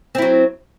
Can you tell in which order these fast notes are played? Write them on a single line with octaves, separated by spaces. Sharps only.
C4 E4 F#3